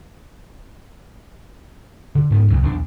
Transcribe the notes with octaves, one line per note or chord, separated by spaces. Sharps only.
D3
G#2 A#3 B3
C2 B2 F#3
B1 E2 F3 D4